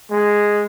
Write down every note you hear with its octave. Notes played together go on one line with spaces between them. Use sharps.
G#3